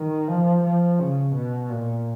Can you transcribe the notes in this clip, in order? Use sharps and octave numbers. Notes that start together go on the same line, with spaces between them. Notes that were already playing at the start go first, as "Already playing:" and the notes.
Already playing: D#3
F3
F3
C#3
B2
A#2